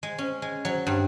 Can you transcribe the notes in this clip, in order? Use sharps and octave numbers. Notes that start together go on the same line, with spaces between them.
G#3
C#4
G#3
F#3
G2